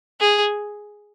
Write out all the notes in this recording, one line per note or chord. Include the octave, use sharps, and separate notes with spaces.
G#4